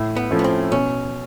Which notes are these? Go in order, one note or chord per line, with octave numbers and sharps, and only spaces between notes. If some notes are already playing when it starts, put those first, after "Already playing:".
Already playing: A2
B3
F3 A3 C#4 E4
B3
C4
B2 C#4